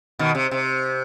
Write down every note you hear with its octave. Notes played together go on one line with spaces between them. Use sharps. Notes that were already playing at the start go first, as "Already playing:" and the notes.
B2 D#3
C3
C3